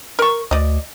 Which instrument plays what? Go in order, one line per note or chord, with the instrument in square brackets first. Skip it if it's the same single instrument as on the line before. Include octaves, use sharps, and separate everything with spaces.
[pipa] A#4 C#6
[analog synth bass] D2 [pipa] D5 D#5